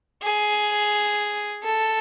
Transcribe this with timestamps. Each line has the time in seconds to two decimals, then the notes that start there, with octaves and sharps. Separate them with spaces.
0.22 G#4
1.63 A4